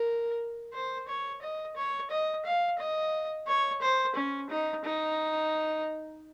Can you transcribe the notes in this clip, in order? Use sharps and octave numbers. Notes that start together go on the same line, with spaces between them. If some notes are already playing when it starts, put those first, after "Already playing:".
Already playing: A#4
C5
C#5
D#5
C#5
D#5
F5
D#5
C#5
C5
C#4
D#4
D#4